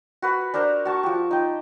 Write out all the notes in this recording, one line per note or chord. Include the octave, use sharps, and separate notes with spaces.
F#4 B4 F#5
D4 A#4 C5 A#5
F#4 A5 C#6
F3 G4
D#4 G5